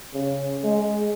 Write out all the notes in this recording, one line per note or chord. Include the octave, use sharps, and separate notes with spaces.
C#3
G#3